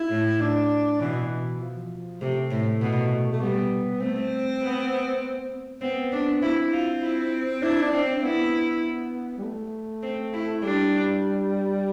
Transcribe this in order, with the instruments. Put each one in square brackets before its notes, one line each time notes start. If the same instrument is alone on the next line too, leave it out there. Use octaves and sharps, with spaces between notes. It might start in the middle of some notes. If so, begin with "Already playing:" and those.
Already playing: [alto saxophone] E4
[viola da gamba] A2
[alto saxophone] D4
[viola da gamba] B2 [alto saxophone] E3
[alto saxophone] F3
[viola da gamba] C3 [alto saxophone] A3
[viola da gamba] A2
B2
[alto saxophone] A3
[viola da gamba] G3 [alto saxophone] B3
[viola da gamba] A3 [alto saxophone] C4
[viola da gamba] B3
[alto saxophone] B3 [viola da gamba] C4
[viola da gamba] D4
[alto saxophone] C4 [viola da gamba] E4
[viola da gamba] F4
E4
[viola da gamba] D4 [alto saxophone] E4
[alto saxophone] D4
[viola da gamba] C4
[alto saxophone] C4
[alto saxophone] B3 [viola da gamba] E4
[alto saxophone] G3
A3
[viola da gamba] C4
E4
[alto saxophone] G3 [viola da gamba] D4